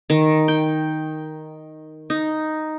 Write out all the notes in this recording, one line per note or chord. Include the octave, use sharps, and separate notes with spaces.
D#3
G5
D#4